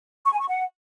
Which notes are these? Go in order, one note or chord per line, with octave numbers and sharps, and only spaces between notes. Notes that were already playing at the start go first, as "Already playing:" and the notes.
C#6
G#5
C#6
F#5